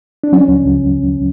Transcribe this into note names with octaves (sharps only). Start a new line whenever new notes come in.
D4
F#3 C#4
C#2
C#2